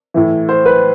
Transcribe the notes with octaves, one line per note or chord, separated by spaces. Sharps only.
A2 E3
C5
B4